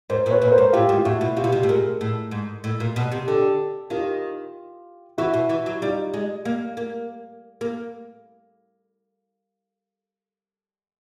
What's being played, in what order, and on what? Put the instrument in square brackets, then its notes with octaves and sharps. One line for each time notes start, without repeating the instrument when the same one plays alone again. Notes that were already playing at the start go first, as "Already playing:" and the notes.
[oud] G#2 [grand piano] A#4 C5
[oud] A#2
[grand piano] B4 C#5
[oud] A#2
[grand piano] B4
A#4 C5
[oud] G#2
[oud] A2 [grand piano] F4 G4
[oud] G#2
[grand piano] F4
[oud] A2 [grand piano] E4 F#4
[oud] B2
[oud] C3 [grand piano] F4 G4
[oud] B2
C3
A2
[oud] A#2 [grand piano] G#4 A#4
[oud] A2
G#2
A2
A#2
B2
C3
[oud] D3 [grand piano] G4 A4
[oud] D#3 [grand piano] F4 G4
[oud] E3 [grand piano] E4 F#4
[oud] B2
E3
F#3
[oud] G3 [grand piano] D#4 F4
[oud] G#3
A#3
A#3
A#3